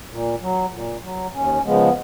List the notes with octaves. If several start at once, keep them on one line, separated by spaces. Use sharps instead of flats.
A#2
F#3
A#2
F#3
D#2 C#4
C#3 F3 G#3 B3